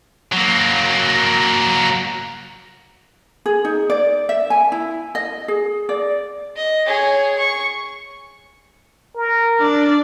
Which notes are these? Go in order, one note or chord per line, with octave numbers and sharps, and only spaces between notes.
F#3 A#3
G#4
D#4
D5
E5
G#5
E4
D#5
G#4
D5
D#5
G#4 C#5
C#6
A#4
D4 D5